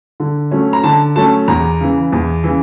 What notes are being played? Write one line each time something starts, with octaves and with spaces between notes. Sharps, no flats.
D3
F#3 A3 C#4
A#5
D3 A5
F#3 A3 C#4 A5
E2 A#5
C#3 E3
E2
C#3 E3